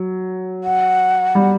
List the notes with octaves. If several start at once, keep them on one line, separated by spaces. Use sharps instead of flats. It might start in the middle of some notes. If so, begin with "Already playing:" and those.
Already playing: F#3
F#5
G3